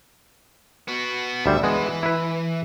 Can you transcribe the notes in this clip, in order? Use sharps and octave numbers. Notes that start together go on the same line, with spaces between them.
B3 F#4
D2 G3 C5 E5
E3 G#3 B3
E4 B4